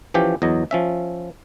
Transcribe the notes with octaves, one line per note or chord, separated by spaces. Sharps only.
E3 F3 C#4 G4
E2 F#3 D#5
F3 C#4 E5